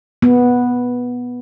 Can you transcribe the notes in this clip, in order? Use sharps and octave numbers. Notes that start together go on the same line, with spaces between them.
B3